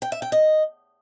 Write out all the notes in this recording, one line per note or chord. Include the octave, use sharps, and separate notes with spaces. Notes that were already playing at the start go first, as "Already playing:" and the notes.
G5
E5
G5
D#5